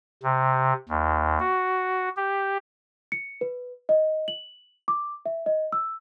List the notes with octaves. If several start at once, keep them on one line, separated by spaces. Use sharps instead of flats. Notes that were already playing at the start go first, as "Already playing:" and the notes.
C3
D#2
F#4
G4
C#7
B4
D#5
F#7
D6
E5
D#5
E6